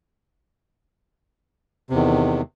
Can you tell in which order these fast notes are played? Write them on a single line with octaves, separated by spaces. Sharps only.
C3 E2 D#3